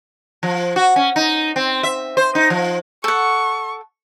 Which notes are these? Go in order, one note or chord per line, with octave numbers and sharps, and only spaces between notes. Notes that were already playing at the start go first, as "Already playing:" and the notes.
F3
F#4
C#4
D#4
C4
E5
C5
D#4
F3
A4 F#5 C#6